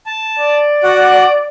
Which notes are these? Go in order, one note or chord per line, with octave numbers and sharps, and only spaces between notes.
A5
D5
F#4 F#5